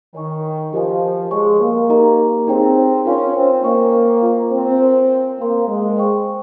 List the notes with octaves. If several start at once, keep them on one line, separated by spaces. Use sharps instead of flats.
D#3 C#5 G#5 C#6
F3 G4 A#4 D#5 G#5
G#3 C#5 G#5 C#6
A#3
D#4 G4 A#4 D#5 A#5
C4 D#4 G#4 C#5 G5 A#5
C#4 F4 A#4 F5 G#5 C6
C4
A#3 C5 D#5 G5 C#6
F4 C5 F5 A#5
C4
A#4 C#5 G#5
A#3 C5 F5 C6
G#3
C5 D#5 G5 C#6